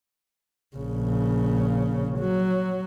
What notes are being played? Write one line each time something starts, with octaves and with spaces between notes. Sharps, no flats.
A#1 C#3
F#3